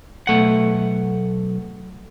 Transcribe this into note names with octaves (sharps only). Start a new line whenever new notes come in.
B1 A3 F#5